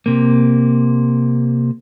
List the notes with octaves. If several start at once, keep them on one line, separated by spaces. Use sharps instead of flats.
C3 A#3